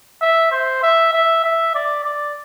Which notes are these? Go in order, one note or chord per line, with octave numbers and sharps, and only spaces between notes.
E5
C5
E5
E5
E5
D5
D5